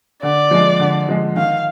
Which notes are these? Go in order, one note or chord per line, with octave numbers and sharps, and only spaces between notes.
D3 D5
F3 G#3
D3
F3 G#3
D#3 F5